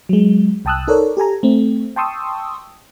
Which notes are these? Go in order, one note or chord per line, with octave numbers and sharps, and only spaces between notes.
F#3 G#3
C2 G5 A5 D#6 E6 F#6
D#4 A4 A#4 C#5 D5
G4 A4 G#5 A#5
A3 C4
G5 A5 C6 C#6 D#6 E6